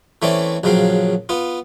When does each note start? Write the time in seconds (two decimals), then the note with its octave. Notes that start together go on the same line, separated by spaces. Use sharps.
0.22 E3 A3 C4 C#4 D5
0.64 A#1 C#3 F#3 C4 F5
1.29 B3 F4